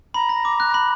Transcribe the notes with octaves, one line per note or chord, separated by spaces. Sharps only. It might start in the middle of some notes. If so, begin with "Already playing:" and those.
A#5 B5
A#6
D6
F#6
B5